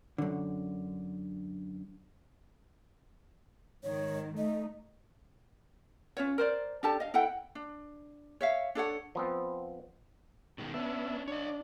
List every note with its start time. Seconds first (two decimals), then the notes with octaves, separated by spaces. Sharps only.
0.18 F#2 D3
3.83 G#2 D#3 C#5
4.37 A3 D#4 D#5
6.17 C#4 F4 C#5
6.38 A#4 C5 D5
6.83 D4 G4 A4 A5
7.00 D#5 F5
7.14 E4 A4 F#5 G5
7.55 D4
8.41 C#5 E5 F5
8.75 D4 A4 C#5 F#5
9.15 F3 B3 C4
10.58 B2 D#3 G#3
10.74 B3 C#4 D4 E5
11.28 D4 C#5 D#5